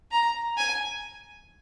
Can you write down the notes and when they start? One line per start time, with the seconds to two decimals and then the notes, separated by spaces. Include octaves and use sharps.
0.12 A#5
0.57 G#5